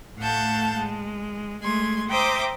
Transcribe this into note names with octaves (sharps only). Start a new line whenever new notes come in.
A2 A3 F5 F#5 A5 G6
G#3
G#3 A3 C6 G#6
C5 E5 G5 A#5 D6 D#6